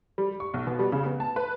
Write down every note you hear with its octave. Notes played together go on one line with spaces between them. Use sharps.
G3
C#6
B1
B2
G3
C#3
B3
A5
B4